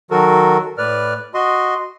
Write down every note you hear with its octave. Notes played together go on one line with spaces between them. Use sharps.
D#3 F#3 F#4 A4 A#4
A2 B4 D5 F6
F#4 D#5 C6